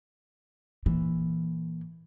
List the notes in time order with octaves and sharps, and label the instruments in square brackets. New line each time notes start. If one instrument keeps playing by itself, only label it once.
[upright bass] A#2 E3